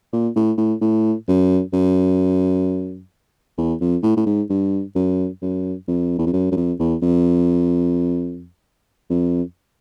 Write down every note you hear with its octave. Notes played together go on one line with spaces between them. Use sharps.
A#2
A2
A2
A2
F#2
F#2
E2
F2
A2
A2
G#2
G2
F#2
F#2
F2
E2
F2
F#2
F#2
F2
E2
F2
F2